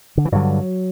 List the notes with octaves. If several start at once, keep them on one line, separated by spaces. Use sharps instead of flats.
D3
E3
G2 D3 F#3